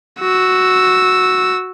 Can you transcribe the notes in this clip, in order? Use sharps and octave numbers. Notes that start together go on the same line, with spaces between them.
F#4 E6